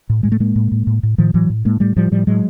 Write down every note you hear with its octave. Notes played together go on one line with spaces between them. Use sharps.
A2
A2 G#3
A3
A2 G#3 A#3
A2
A2
A2
A2
A2 D#3 F3
A2 E3 F#3
A2
A2 G#3 A#3
A2 G3 A3
A2 F3 G3
A2 F3 G3
A2 F#3 G#3